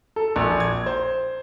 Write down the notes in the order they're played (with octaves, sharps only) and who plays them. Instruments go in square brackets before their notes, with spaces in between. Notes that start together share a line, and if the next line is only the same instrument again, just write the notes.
[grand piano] A4
A#1
G#6
C5